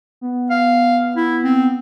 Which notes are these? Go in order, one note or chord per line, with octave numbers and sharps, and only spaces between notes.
B3
F5
E4
C4